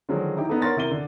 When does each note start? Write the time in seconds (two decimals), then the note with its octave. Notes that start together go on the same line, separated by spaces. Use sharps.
0.09 D3 D#3 F3 F#3 G#3
0.37 D#4 E4 G4
0.49 B3 D4 D#4 A4
0.62 A#4 C#5 F#5 C6 A6 A#6
0.76 C3 E4 A#4 D6 D#7 G7
0.91 D3